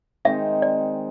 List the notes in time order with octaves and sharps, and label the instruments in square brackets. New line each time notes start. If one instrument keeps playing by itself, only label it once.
[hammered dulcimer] D#3 G#3 C4 D#4 [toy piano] E5
[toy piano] D5